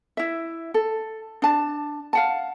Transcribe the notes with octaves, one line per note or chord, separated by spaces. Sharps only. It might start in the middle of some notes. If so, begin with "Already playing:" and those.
E4 E5
A4
D4 A5
F5 F#5 A5